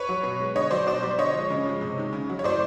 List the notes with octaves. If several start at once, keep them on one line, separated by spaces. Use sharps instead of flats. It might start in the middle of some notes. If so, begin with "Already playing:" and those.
Already playing: B4 C#5
F#3
B2
G#3
D3 C#5 D#5
F#3 C5 D5
B2 C5 D5
G3
D3 C#5 D#5
F3 G#3
C#3
F3 G#3
C3
D#3 G#3
C#3
F#3
C#5
A2 C5 D5